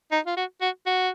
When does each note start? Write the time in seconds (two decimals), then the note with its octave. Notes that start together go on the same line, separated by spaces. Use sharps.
0.12 D#4
0.27 F4
0.37 F#4
0.62 F#4
0.87 F#4